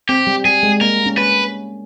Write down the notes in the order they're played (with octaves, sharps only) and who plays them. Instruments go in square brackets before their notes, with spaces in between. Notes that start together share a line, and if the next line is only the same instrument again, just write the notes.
[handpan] C4 [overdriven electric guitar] G4
[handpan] G3
[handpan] G3 [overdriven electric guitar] G#4
[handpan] G#3
[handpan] A#3 [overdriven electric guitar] A#4
[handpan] C#4
[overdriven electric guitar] B4